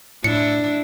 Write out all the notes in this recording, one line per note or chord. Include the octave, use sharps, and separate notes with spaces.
A2 D4 E4 C#7